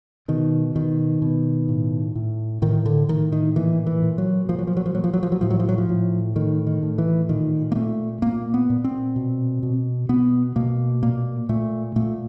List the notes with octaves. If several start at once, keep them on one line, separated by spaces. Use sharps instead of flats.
B2 D#3
B2 D#3
B2
A2
A2
A2 D#3
D3
A2 D#3
D#3
A#2 E3
E3
A#2
F#3
A#2 F3
F#3
F3
F#3
F3
A#2 F#3
F3
F#3
F3
F#3
A2 F3
F#3
F3
F#3
F3
A2
A2 D#3
D#3
A2
E3
A#2 D#3
A#3
A#2 A3
A#2 A#3
B3
A#2
C4
B2
B2
B2 B3
B2 A#3
A#2 A#3
A#2 A3
A#2 A3